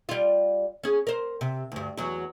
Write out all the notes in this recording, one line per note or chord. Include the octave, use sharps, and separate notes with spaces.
G3 F4
C#4 G#4
A#4 C5
C3
D2 G2
E2 F#3